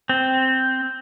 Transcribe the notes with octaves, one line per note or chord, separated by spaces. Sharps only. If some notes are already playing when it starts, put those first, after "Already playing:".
C4